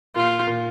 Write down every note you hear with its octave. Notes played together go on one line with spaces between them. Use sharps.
A#2 F4
A#2